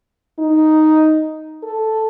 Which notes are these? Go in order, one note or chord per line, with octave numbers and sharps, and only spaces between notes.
D#4
A4